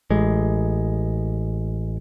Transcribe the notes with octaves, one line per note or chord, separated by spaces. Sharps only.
A1 G#3